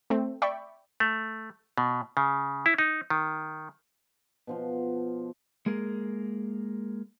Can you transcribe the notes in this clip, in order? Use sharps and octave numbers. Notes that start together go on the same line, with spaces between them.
A3 C4
D5 E5 G5 B5 C#6
A3
B2
C#3
E4
D#4
D#3
B2 F3 C6
G#3 A#3 G#4 A#4